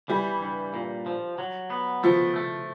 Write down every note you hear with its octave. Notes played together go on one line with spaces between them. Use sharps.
E3 G3
G2
A#2
F3
F#3
B3
F3 A3
A3